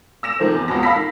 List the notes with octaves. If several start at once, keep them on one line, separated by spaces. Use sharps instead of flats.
E6 A#6 E7
C3 D#3 F3 A3 C4
E2
C#2 B2 F#4 A5 A#6
F5 B5 E6 A#6 B6
D#3